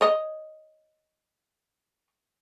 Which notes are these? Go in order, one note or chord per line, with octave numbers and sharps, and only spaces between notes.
C#5 D#5